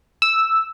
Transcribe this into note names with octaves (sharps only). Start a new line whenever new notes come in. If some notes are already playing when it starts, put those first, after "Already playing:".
E6